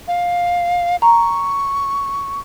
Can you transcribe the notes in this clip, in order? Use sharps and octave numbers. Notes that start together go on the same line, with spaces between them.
F5
A#5 C#6